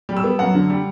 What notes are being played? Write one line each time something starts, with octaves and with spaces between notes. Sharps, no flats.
G3
E6
B3
F#2 F#5
D3
G3